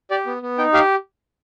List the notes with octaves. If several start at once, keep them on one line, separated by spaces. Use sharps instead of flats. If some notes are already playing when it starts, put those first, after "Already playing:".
G4 D5
B3
B3
D#4 G5
G4 F5